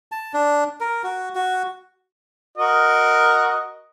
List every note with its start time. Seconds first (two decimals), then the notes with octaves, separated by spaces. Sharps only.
0.12 A5
0.34 D4
0.80 A#4
1.04 F#4
1.35 F#4
2.58 F#4 A#4 D#5